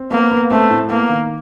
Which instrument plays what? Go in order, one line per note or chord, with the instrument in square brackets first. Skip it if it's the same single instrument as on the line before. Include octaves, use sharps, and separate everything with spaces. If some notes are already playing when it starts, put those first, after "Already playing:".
Already playing: [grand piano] C4
[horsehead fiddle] A#3 [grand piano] B3
[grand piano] B3
[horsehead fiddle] A3 [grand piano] C4
[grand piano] A2
[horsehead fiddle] A#3 [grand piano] B3
[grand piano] D#3